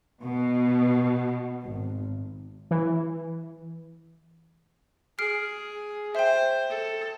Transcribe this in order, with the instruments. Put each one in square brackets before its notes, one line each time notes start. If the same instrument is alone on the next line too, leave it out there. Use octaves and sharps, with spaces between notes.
[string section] B2
G#1
[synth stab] E3
[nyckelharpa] G#4 [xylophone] F6 C7 D7
[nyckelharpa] C5 [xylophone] E5 G5
[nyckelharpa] A4